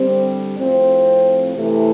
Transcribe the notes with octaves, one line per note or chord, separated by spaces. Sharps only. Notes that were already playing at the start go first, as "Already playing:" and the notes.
Already playing: D3 G3 C4
A2 F3 A3 C4
C3 E3 A3